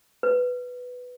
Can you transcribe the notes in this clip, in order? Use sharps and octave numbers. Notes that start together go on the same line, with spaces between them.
B4